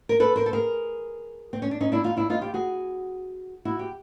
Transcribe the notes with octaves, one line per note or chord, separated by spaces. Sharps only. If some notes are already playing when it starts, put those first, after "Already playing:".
A#4
A4 B4
A#4 C5
A4
G#4 A#4
C4
C#4
D4
C#4 D#4
D4 E4
D#4 F4
D4 E4
D#4 F4
F4 G4
F#4 G#4
E4 F#4
G4